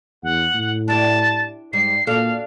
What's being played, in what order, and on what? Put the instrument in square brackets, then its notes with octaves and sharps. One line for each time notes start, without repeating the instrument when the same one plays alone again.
[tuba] E2 [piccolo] F#5
[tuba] A2
[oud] D4 E4 G4 [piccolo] A5
[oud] G#2 G3 [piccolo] C7
[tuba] A#2 [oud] D4 F#4 A4 [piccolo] F5